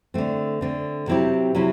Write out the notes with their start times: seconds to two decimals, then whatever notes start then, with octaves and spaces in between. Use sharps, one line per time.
0.14 D3 A3 C4
0.61 D3 A3 C4
1.07 C3 F#3 C4 E4 G4
1.55 C3 F#3 C4 E4